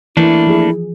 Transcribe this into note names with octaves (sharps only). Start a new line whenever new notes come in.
E3 A3 A#3 D4 E4
F3 G#4